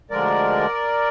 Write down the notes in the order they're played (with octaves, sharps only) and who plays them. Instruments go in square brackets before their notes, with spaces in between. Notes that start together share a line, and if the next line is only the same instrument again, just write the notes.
[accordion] D2 D3 F3 G#3 A#4 D5